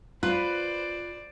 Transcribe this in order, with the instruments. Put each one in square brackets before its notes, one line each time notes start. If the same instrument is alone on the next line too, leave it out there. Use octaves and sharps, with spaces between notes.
[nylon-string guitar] F4 [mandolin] B4 [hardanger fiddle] C5 D5